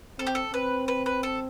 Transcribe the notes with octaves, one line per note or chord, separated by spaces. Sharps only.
C4 A4
G4
A4
C4 B4
B4
B4
A4